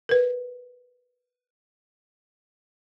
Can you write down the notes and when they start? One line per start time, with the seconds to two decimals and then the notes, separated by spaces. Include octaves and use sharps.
0.09 A#4 B4